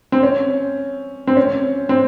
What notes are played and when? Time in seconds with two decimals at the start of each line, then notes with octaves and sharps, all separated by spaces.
0.12 C4
0.23 C#4
1.27 C4
1.37 C#4
1.89 C4